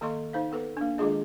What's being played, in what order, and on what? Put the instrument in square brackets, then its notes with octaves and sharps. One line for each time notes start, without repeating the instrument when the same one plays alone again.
[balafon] D#3 A#3 A4 D#5 C6 C#6
D#4 C5 F5
B3 A4 B4
A#3 D4
D#3 G#3 D4 F4 G#4 D#5